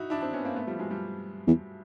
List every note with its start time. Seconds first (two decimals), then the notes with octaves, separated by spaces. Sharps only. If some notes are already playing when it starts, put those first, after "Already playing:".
Already playing: D#4 E4 F#4
0.10 D4 E4
0.21 C4 D4
0.33 B3 C#4
0.45 A#3 C4
0.56 A3 B3
0.67 F3 G3
0.79 F#3 G#3
0.90 F3 G3
1.47 E2